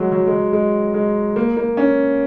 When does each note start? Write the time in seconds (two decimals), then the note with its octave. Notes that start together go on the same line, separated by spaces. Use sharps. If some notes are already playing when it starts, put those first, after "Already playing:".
Already playing: F#3 G#3
0.12 F#3
0.27 G#3
0.32 F#3
0.53 G#3
0.94 G#3
1.36 A#3
1.57 A#3
1.77 C#4